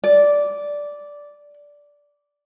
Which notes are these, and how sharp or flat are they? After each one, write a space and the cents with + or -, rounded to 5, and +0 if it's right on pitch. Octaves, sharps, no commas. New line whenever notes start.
D5 -10